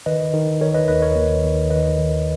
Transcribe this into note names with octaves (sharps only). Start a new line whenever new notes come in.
D#3 B4 D#5
D#3
D#3 A#4 C#5
B4 D#5
D#2 B4 D#5
A#4 C#5
D#2
D#2
D#3 B4 D#5
D#3